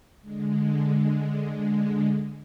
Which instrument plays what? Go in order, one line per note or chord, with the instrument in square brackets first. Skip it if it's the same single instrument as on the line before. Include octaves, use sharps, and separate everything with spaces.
[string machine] D3 G#3